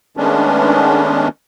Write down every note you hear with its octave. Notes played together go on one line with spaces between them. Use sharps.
D#3 G#3 A3 B3 C#4 D4